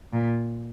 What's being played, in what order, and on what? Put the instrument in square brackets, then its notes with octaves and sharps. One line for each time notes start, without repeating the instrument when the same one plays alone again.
[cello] A#2